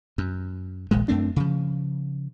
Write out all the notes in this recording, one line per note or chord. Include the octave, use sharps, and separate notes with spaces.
F#2
D#1 A#1 A#2 G#3
F#2 A3 C4 D4
C#3 F3